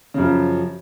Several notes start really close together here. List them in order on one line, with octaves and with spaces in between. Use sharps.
C#3 F#2 F3